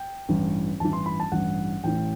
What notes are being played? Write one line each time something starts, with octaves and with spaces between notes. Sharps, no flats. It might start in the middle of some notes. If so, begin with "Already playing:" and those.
Already playing: G5
A1 G2 E3
A1 G2 E3 A5
C6
B5
A5
A1 G2 E3 F#5
A1 A2 E3 G5